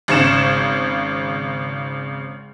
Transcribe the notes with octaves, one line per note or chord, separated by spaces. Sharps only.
G#1 C#3 C#7 E7